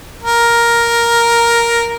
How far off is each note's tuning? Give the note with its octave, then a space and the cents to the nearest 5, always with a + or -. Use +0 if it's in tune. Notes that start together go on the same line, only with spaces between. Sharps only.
A#4 +5